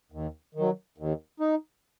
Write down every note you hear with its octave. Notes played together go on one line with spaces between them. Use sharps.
D#2
D#3
F#3
D#2
D#4